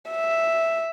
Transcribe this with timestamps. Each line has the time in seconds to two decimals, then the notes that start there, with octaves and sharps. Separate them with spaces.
0.10 E5